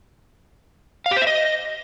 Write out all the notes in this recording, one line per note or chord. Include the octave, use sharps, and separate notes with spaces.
F5
G4
C5
E5
D#5